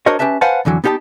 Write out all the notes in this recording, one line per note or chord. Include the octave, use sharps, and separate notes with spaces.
D4 F#4 A#4 C5 C#5 D#5
C#4 G4 B4 E5 A5
B4 C5 F5 F#5 G#5 A5
F2 D3 E3 F#3
B3 D#4 G4 F#5 A5